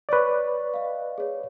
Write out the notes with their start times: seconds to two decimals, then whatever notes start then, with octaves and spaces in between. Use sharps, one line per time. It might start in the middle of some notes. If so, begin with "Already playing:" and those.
0.09 B4 C#5 D5 C#6
0.74 D#5 F5
1.18 G#4 C#5